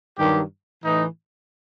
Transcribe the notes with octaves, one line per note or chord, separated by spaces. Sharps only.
G2 D#3 F#3 G4
A2 E3 D#4